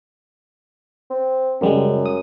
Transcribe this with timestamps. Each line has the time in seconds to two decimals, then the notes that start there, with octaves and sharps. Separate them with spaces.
1.10 C4
1.61 F#2 C#3 G3 G#3
2.06 D#6